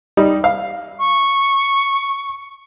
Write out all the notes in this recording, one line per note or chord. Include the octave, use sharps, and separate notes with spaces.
G3 D#4
F5
C#6